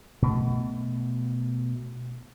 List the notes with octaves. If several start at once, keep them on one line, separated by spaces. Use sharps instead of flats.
B2 A3